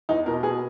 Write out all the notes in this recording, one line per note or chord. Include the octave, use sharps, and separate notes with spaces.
E2 D#4
B2 A#4
B2 G#4